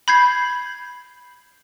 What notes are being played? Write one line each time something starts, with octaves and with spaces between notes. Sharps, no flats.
B5 G6 G#6 C7